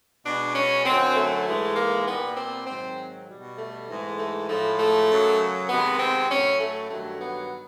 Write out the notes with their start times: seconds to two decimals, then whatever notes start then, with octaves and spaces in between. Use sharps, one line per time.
0.25 B2 G#3 D4
0.55 C#4
0.86 F#2 D3 F#3 C4
1.16 A3
1.46 G#2 E3 G#3
1.76 A#3
2.07 A#2 G3 B3
2.37 C4
2.67 G#2 D#3 F#3 C4
3.28 B2 G3
3.57 A3
3.88 G#2 E3 G#3
4.18 A3
4.48 A2 F3 G#3 A3
4.79 A3
5.09 F#2 C#3 F#3
5.69 C3 D#3 G#3 B3
5.99 C4
6.30 A2 F#3 C#4
6.61 A3
6.90 G2 D#3 F#3 A3
7.21 B3